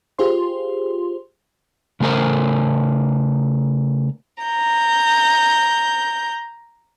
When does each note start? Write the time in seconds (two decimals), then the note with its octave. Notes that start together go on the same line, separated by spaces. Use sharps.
0.19 F4 G4 G#4 C5 C6
2.00 C#3 A3 F4 A#4 C5
4.43 A#5 G6